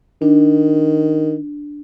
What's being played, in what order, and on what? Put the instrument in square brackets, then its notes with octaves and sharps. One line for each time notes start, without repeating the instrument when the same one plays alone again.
[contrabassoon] D#3 [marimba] D4